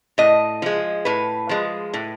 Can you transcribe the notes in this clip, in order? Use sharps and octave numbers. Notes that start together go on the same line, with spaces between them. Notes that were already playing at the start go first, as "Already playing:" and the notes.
A2 D#5
F3 G#3
A2 B4
F3 G#3
A2